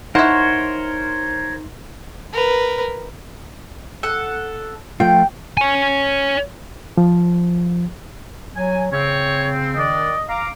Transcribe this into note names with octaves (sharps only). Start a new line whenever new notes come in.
D#4 E4 A#4 C5 C#5 F#5 C6
A#4 B4
A4 F#5
F3 A3 F4 G5
C#5 G#5
F3
F#3 G#5
C#3 C4 C#5
D#3 D4 D5 D#5
F5 A#5 D6